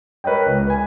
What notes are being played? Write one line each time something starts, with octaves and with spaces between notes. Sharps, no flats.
A#4 B4 C#5 D#5 G5
C#2
B4 G#5